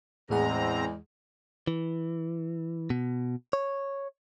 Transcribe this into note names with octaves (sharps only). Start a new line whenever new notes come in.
E2 A2 G#3 C4 G#4 F#5 A#5
E3
B2
C#5